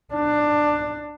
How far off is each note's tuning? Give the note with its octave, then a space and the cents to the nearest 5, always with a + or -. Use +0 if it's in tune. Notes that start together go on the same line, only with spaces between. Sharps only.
D4 +15